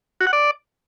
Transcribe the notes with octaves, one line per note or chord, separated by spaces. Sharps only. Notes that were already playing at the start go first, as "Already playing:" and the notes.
F#4
F#5
D5